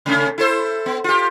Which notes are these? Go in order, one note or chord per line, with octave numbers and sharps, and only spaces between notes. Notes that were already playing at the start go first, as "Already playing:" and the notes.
C3 A3 C#4
E4 A4 C5
B3
F4 G4